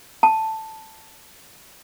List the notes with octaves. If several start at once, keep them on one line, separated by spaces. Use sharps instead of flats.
A5